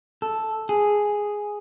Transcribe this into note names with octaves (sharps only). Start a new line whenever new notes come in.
A4
G#4